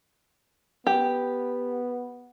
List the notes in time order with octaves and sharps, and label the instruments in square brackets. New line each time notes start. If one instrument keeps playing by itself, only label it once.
[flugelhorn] B3 [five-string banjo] G4